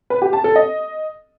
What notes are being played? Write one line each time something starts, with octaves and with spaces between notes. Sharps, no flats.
B4
G4
A5
A4
D#5